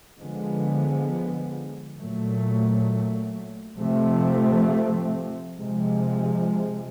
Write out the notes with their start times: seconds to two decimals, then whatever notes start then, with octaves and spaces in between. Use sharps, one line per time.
0.19 D3 F3 G#3 B3
1.98 A#2 F#3 A3
3.77 C3 F3 A3 C4
5.57 C3 F3 G#3